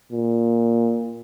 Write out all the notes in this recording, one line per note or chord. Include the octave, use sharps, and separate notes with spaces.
A#2